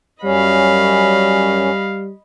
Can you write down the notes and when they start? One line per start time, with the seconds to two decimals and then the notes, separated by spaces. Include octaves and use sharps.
0.23 F#2 G3 C#4 D#5 F5 B5